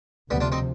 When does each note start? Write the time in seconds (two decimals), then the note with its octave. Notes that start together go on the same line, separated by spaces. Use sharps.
0.30 D2 C3 F3 G3 B3
0.40 D4 F4
0.52 C4 D#4